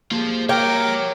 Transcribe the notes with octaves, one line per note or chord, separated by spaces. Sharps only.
A#3 F4 G4 G#4 C5
A#4 C#5 G5 A#5 D6